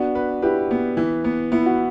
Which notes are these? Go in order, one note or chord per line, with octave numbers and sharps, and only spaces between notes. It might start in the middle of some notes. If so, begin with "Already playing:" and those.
Already playing: B3 D4 F#4
B4
E4 G4 B4
B3
E3
B3
B3 E4
F#4